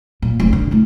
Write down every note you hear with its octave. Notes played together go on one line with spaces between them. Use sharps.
A#2
F1
D3
A3 E4